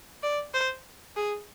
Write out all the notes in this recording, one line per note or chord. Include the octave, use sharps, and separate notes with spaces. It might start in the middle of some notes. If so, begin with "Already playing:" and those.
D5
C5
G#4